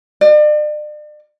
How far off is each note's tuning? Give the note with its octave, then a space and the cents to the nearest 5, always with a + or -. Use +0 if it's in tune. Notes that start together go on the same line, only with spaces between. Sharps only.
D5 +40